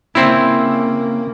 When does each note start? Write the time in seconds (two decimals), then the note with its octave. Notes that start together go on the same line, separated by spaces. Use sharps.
0.15 C#3 A#3 C4 E4